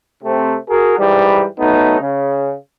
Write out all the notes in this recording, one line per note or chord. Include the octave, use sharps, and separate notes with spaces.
C3 A3 C4
F#4 G#4 A#4
G#2 E3 G3
F#3 A3 B3 D#4
C#3